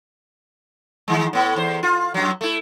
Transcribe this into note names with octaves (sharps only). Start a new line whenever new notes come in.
D#3 G#3
A2 B3
E2 C5
F4
F#2 F#3
A3 E4